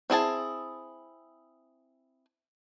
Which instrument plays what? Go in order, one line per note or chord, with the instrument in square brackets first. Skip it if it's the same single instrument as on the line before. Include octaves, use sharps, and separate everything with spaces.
[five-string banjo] C4 E4 G#4 A5